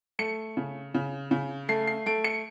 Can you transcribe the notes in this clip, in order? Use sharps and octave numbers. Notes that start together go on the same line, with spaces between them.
A3 C#7
C#3
C#3
C#3
A3 C7
C7
A3 D7
C#7